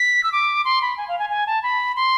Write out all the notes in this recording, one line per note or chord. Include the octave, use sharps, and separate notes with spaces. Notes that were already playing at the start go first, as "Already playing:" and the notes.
Already playing: B6
E6
D6
C6
B5
G#5
F5
G#5
G#5
A5
B5
C6